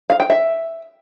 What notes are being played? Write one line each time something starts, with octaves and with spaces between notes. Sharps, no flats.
F5
G5
E5